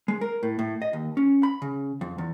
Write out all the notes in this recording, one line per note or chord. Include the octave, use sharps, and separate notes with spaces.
G#3
A#4
A2
A2
D#5
D#2
C#4
B5
C#3
F2
E2